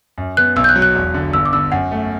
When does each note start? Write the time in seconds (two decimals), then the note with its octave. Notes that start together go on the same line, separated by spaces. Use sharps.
0.18 F#2
0.37 B3 F#6
0.56 B1 E6
0.64 G6
0.69 F#6
0.76 F#3
0.82 F#6
0.96 E1
1.14 D3
1.33 G1 E6
1.46 D6
1.53 D3 E6
1.72 F#2 F#5
1.92 A3